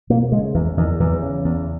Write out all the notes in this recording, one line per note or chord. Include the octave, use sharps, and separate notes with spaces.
B2 A#3
C#3 G#3
E2 E3
E2 D#3
E2 E3
C#3
E2